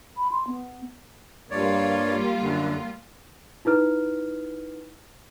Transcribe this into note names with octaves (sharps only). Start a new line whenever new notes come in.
B5
C6
B3
G2 G3 A#3 F4 C#5 D5
F#2 D3
D#4 E4 B4 F6